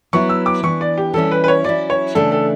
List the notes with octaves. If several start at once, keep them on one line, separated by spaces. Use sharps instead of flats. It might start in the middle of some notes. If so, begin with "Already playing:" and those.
F#3 B3 E4 C#6
E6
D6
E3 B3 D4 C#6
D5
G4
E3 G3 C#4 E4 A4
B4
B4
C#5
F#3 C#4 E4 D5
C#5
C#3 E3 A3 D4 A4
A4